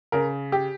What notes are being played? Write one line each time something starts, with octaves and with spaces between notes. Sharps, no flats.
C#3 A#4
G4